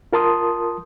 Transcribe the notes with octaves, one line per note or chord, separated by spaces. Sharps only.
F4 A#4 A5 C6 D#6